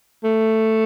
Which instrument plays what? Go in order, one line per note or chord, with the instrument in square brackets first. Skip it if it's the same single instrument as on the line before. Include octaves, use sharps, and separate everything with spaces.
[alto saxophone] A3